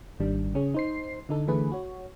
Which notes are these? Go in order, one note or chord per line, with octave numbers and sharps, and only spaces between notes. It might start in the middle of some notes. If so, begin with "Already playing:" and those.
G#1 D#3 G3 D4
C#3 C#4 G#4
D#4 C5 C7
D3 D#4 A4
D3 E3 A3 G#4 B4
F#4 C#5